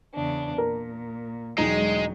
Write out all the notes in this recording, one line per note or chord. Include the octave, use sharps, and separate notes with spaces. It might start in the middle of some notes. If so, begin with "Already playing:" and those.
E2 C#3 D4
A#2 A#4
E1 F#3 G#3 D#4